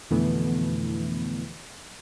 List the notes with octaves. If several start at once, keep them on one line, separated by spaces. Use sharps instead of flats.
F2 B2 D3 E3 A3 B3